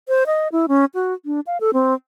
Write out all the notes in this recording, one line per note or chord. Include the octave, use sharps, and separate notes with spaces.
C5
D#5
E4
C#4
F#4
D4
F5
A4
C4